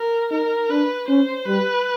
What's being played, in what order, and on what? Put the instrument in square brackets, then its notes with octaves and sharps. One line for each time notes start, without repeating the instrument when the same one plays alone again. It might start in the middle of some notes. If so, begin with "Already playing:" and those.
Already playing: [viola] A#4
[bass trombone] D#4 [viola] A#4
[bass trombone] D4 [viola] B4
[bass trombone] C#4 [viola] C5
[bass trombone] G3 [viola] B4